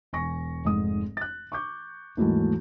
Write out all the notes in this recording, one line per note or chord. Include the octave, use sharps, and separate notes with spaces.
E1 G#5 C#6 A#6
F1 G#2 G#3 D#6
F#6 A6
C#6 D6 G6
D#2 G#2 E3 F#3 A3